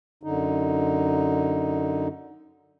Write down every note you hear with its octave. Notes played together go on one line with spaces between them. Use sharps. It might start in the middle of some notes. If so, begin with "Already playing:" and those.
F#2 D3 D#4